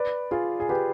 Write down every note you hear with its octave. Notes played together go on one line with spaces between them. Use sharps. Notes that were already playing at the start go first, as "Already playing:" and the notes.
Already playing: B4 D5
F4 G#4
G#4
G4 B4